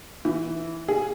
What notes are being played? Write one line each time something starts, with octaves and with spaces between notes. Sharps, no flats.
E3
G#4